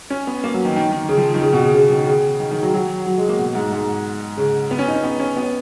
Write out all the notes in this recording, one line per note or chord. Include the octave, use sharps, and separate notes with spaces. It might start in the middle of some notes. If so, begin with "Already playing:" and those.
C#4
B3
A#3
F#3
D#3
D#3
D#3
C#3
F3
D#3
C#3
B2
C#3
C#3
D#3
C#3
D#3
D#3
F#3
F#3
F#3
G#3
A#3
B2
G#2
G#2
C#3
B3
C#4
D#4
C#4
B3
C#4
B3